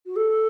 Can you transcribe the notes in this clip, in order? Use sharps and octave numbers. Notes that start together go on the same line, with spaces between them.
F#4
A4